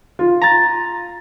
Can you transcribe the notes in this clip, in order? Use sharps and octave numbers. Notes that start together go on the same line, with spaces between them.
F4
A#5 A6